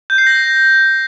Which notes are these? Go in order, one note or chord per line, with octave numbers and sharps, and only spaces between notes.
G6
C7
A#6